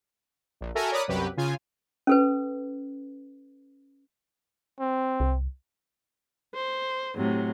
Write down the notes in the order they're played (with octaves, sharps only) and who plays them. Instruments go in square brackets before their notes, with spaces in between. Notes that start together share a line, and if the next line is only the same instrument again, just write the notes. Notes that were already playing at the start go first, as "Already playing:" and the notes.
[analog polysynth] A#1
F#4 A4 A#4 E5 G#5 A#5
A#4 C#5 D5 B5 D#6 F#6
C2 F#2 F#3 G4 B4
C#3 F4 G#5
[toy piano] C#4 A4 B4
[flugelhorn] C4
[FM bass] C2
[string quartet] C5
A2 C3 F#3